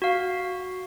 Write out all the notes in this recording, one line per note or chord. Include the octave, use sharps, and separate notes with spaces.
F#4 F5